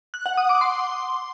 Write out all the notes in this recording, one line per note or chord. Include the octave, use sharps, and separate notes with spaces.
F#6
F#5
D#6
D6
C6